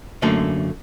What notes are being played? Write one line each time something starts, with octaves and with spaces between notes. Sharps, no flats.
F#2 D3 A3 A#3 A4